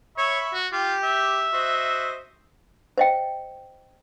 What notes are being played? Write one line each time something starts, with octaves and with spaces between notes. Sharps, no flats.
C#5 E5 B5 C#6
F#4
F4 G4 G5
E5
F#4 C5 D#5
C5 D#5 G5